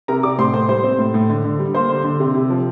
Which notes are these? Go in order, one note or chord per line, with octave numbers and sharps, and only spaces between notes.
C3 A#4 A#5
C3 D5 D6
A2 C5 C6
A2 C5 C6
G3 C5 C6
C4
A2
A2
D3
D3
G3
A#3 C5 C6
D3
D3
C3
C3
F3